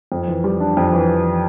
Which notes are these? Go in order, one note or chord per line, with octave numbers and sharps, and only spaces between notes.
F2
E3
G3
D4
F2
E3